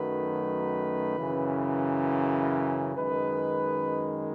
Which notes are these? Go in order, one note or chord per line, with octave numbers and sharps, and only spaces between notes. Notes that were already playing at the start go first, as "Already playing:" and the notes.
Already playing: F#2 D#3 F#3 A3 B4
F#2 C#3 E3
F#2 D#3 G#3 B4